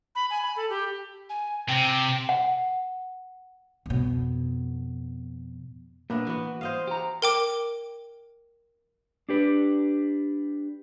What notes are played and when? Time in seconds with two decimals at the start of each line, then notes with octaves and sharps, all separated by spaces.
0.15 B5
0.30 G#5
0.43 B5
0.56 A4
0.70 G4
1.29 G#5
1.69 C3 G5
2.29 F#5
3.86 F2 B2
6.10 A#2 A#3 B3 D4 E5
6.27 E3 B3 F#4
6.61 C5 D#5 F5
6.87 G4 A#5
7.22 A#4 G5 D6
9.29 D4 G4 B4